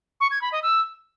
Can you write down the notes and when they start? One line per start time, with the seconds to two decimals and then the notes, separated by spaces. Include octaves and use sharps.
0.20 C#6
0.31 G#6
0.42 B5
0.52 D#5
0.63 E6